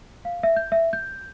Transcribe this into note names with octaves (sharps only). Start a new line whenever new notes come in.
F5
E5
G6
E5
G6